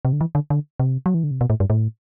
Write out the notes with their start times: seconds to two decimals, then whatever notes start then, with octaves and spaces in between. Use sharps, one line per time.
0.05 C3
0.13 D3
0.21 E3
0.35 D3
0.50 D3
0.80 C3
1.06 F#3
1.14 E3
1.24 D3
1.31 C3
1.41 B2
1.50 A2
1.60 G2
1.70 A2